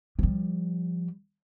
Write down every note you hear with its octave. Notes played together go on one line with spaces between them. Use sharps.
F3 G3